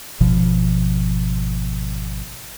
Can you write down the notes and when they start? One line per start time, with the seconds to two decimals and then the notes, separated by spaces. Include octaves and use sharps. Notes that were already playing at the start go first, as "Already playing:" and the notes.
0.20 G#1 B2 F3